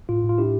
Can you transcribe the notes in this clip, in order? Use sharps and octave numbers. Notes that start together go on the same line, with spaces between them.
A2 F4
A2
F4
D4 E4 G4